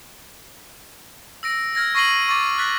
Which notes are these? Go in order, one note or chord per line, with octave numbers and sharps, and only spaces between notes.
E6 A#6 D7
F6 G#6 A#6
C#6 A#6 C7 D#7 F#7 G7
C#6 D6 A6
F#6 A6 B6